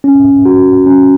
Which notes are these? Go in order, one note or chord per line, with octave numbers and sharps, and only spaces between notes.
C#4
F#4
C#4